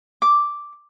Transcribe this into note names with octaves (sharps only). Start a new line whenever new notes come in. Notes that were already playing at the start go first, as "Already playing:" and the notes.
D6